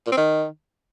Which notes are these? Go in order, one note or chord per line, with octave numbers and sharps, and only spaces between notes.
A#2
C4
D#3